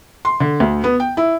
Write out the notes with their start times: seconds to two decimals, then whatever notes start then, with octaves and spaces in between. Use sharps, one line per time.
0.25 C6
0.40 D3
0.60 D2
0.84 B3
1.00 G5
1.17 E4